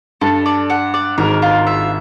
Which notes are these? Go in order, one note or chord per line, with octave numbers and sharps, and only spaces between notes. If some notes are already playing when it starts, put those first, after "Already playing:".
G2 A4
D5
F#5
D5
G#1 G#2 A#4
F4
E5